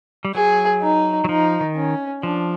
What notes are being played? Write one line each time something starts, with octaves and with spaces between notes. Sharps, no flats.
G3
F#3 G#4
D#4
F#3
F3 D#4
D#3
C#4
F3 D4